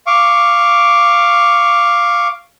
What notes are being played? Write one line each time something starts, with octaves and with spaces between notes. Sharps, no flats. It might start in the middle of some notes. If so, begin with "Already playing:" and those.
F5 C#6 D6